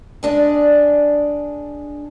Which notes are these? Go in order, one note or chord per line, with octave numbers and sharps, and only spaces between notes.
G#3 D4 G#4